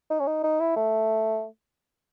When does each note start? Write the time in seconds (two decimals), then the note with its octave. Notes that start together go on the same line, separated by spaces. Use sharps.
0.10 D#4
0.20 C#4
0.27 D#4
0.44 D#4
0.60 E4
0.76 A3